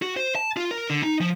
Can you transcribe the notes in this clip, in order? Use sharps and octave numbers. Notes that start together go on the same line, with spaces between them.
F#4
C5
A5
F4
A#4
D3
D#4
F3